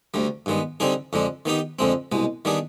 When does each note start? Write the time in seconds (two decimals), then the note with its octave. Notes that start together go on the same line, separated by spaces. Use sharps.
0.14 D2 D3 G3
0.46 G2 D#3 G#3 B3
0.80 D3 G3 C4 D#4 G#4
1.13 F2 D3 G#3 D4
1.46 D#3 B3 D#4 G4
1.79 F2 D3 G#3 C4
2.12 C2 B2 G#3
2.45 D#3 G3 B3 D4 G#4